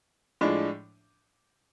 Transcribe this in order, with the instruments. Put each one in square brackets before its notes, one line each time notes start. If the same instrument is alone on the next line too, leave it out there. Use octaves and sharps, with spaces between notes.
[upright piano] A2 F3 G#3 D4